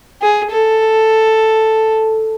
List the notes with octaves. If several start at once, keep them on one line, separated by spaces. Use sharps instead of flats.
G#4
A4